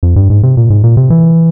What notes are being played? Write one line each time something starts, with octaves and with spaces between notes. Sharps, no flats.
F2
G2
G#2
C3
A#2
G#2
A#2
C3
E3